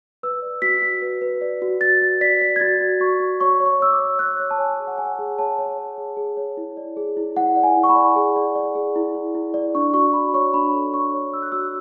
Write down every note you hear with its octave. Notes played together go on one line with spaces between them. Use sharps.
B4 E6
D5
F#4 B6
F#4
B4
B4
D5
F#4
F#4 A6
F#4
D5 B6
D5
G#6
F#4 A6
F#4
F#4 C#6
F#4
C#5 C#6
C#5
C#6
C#5 E6
D6
C#5
C#5 F#6
C#5
A5
C#5 G#5
G#4
F#5
C#5 G#5
G#4
C#5 A5
C#5
C#5
G#4
G#4
C#5
E4
D5
G#4
E4
E4 F#5
D5
G#5
E4
C#6
B5
D5
G#4
D5
D5
G#4
E4
E4
E4
D5
D4 C#6
F#4 C#6
F#4 B5
C#5 C#6
D4 B5
A4
D4 C#6
C#5
C#5 E6
F#6
F#4 E6